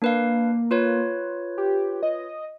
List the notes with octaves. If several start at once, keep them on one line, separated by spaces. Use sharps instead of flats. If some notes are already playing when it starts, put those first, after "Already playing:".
A#3 D4 B4 F5
F4 B4 C#5
G4
D#5